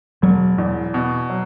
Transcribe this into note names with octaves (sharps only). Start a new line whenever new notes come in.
E1 F#3
E2
B2
F#3